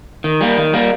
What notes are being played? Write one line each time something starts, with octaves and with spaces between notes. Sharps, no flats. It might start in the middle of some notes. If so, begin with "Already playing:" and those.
D#3
G3 A#3
D#3
G3 A#3